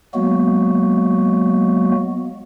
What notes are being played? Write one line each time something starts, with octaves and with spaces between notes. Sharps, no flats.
F#3 G#3 A#3 B3 F#4